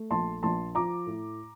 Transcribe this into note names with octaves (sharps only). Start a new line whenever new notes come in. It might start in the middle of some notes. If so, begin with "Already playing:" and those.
Already playing: A3
A#1 A5 C6
A#1 A5 C6
F3 A#5 D6
A2